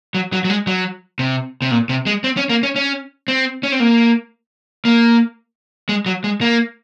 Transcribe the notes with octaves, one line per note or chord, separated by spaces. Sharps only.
F#3
F#3
F#3
G#3
F#3
C3
C3
A#2
C3
G#3
C4
C#4
A#3
C#4
C#4
C4
C#4
C4
A#3
A#3
G#3
F#3
G#3
A#3